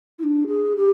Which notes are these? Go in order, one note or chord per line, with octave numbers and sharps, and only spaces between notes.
E4
D4
G#4
G4